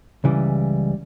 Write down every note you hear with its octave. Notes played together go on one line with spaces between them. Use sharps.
C#2 C#3 E3 G3